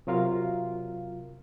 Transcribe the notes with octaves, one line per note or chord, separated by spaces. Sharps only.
C3 F#3 F4 A#4 F5